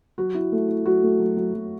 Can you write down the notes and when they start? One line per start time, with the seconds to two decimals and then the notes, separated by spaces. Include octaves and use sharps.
0.18 F#3 F#4
0.34 E4
0.52 A3
0.68 E4
0.86 F#3 F#4
1.03 A3
1.19 F#3
1.37 F#3
1.54 F#3